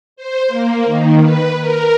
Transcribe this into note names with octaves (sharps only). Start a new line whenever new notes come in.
C5
A#3
D#3
B4
A#4